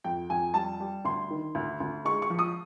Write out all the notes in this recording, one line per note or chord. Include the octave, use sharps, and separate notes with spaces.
F2 G5
F2 G#5
G3 A5
G3
D2 C6
D#3
D2
D2
G#3 C#6
C#6
F3
D#6